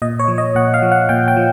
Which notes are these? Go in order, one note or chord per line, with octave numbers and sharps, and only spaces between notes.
A#2 D#5
C#5
F3
D#5
A#2 F#5
F5
F3
F#5
A#2 G5
G5
F3